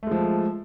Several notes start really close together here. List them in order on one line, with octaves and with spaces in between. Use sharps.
A3 G#3 F3